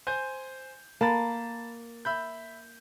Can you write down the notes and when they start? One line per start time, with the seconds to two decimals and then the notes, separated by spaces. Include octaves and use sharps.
0.07 C5 G#5 G6
1.01 A#3 A5 B5 A6
2.05 E5 B5 G6